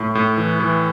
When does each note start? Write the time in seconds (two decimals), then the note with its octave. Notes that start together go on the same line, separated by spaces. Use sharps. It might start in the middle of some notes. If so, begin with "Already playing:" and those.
Already playing: A2
0.15 A2
0.37 E3
0.60 E3